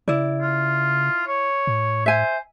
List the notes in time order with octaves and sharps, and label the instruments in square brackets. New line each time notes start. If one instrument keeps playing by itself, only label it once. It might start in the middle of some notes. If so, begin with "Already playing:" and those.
[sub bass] C#3 [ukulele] E4 D5
[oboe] F4
C#5
[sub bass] A2
[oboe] C5 [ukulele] E5 G#5